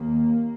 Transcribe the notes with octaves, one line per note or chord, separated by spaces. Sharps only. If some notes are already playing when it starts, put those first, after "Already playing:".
Already playing: D#2 A#3